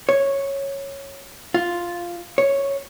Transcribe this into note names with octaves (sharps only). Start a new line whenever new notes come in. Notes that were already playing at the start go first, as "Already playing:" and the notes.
C#5
F4
C#5